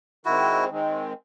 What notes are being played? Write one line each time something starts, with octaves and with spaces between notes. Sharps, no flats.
D#3 G#3 C4 E4 F#4
D#3 G#3 C4